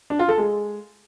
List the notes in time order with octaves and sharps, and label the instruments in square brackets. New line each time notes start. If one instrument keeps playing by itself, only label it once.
[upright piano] D4
F4
A4
G#3